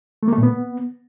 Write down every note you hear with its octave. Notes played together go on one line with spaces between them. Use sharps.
A3
A#3
A3
A#2
B3